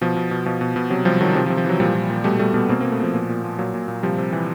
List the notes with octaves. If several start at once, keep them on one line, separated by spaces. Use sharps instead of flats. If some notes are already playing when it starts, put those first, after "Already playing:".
B2 F3
B2
B2
B2 F3
B2
B2
C3 F#3
C3 F3 G3
D#3 F#3
C3 F3
F3
C3
F3
E3 F#3
A#2 F3 G3
A#2
A#2
B2 G3 A3
B2 G3 A3
B2 A3 B3
B2 A#3 C4
A#3 C4
B2
A3 B3
B2 F3
A#2
A#2
A#2
A#2 F#3
A#2
A#2
C3 F3 G3
C3
E3